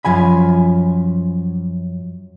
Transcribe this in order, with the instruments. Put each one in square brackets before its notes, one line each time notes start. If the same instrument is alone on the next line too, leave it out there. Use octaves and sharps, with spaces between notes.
[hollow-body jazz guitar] F#2 F3 G#5 B5